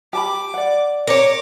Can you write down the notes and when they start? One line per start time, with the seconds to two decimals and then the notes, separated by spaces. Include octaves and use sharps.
0.13 G4 A5 B5 D6
0.54 D5 F#5
1.07 A#4 C#5 D6